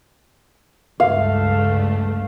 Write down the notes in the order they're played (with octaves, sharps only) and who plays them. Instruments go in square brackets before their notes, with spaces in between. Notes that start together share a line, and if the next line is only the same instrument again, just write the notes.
[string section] C#2 G2 A3 [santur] F5